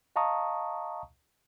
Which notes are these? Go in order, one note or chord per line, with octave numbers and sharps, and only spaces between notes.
D#5 F5 A5 A#5 C#6 D#6